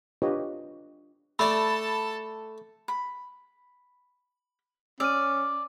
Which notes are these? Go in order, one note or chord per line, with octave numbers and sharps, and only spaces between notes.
D4 F4 G4 B4 C#5 D#5
A3 A4 D5 A5 B5
B5
C#4 D5 E6 F6 D#7